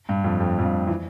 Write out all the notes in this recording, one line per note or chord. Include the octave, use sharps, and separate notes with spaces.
G2
F2
F2
F2
G2
E3